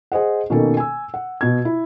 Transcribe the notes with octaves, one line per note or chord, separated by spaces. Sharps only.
G#4 C5 D#5 F#5
B2 D#3 A#3 C#4 A4
G#5 E6
F#5
B2 G#6
E4